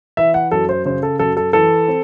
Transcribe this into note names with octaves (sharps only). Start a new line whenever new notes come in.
E3 E5
F#5
F#2 A4
C5
C#3 C5
A4
F#2 A4
A4
E3 A4
C4